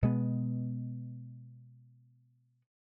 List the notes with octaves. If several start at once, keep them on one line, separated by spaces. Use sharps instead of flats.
B2 G#3 B3